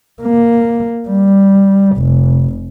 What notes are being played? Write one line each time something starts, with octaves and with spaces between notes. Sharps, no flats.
A#3
G3
F1